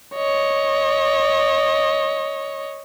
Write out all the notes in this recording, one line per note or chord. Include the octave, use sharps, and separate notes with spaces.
C#5 D#5